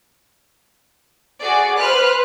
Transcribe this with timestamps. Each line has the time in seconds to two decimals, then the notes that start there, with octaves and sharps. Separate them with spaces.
1.40 F#4 G#4 D5
1.77 B4 C5 F6 F#6